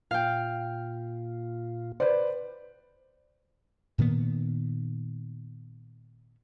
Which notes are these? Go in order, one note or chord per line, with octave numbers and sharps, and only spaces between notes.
A#2 F4 F5 G5
B4 C5 D5
A#2 D#3 A#3 B3